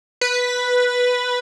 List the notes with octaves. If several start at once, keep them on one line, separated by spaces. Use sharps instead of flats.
B4